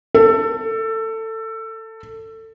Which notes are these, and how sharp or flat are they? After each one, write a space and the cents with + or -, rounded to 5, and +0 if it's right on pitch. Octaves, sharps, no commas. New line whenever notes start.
A4 +20